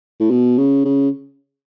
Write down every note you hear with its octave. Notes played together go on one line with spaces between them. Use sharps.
A2
B2
C#3
C#3